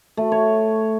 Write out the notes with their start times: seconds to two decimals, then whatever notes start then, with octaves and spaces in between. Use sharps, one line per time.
0.17 A3
0.32 C#5